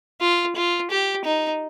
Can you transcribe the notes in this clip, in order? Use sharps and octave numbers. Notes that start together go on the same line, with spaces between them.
F4
F4
G4
D#4